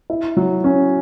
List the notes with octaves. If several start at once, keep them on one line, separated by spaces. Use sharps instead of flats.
E4
F#3
C#4